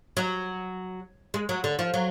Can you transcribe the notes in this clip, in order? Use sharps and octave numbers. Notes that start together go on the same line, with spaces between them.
F#3
G#3
F#3
D3
F3
F#3